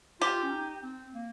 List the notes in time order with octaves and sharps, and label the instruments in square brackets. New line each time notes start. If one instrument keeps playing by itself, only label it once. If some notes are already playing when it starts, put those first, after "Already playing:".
[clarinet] F4 [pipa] G4
[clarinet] C#4
D#4
C4
A#3